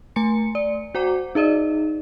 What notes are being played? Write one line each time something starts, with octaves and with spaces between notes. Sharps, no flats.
A3 G#5 C6 C#7
D5
F#4 C5 F#5 A#5 D6
D#4 G#4 D5 D#5